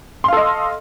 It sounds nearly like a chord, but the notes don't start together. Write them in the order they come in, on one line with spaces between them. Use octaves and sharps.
C6 F5 A4 D#5